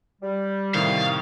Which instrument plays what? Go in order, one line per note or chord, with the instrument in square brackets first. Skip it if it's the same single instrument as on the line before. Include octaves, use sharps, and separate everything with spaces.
[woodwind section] G3
[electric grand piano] A2 C3 D#3 [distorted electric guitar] F5